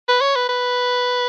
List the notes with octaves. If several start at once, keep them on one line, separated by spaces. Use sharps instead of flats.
B4
C#5
B4
B4